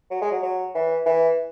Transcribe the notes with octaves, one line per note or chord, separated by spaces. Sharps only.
F#3
G#3
F#3
F#3
E3
E3